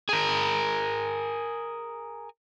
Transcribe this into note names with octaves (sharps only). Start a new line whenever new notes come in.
G#4 A#4